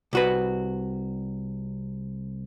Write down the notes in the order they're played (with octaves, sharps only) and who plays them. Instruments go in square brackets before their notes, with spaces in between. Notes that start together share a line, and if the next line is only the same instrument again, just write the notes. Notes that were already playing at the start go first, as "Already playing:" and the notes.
[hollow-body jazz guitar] C2 F#4 B4